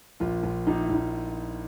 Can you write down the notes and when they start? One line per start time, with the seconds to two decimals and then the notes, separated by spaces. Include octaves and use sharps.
0.20 A#1 F4
0.43 A#1
0.66 A#1 D#4
0.81 E4
0.89 A#1 D#4